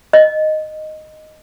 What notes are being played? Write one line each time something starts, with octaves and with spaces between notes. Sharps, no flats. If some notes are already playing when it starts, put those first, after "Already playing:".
D#5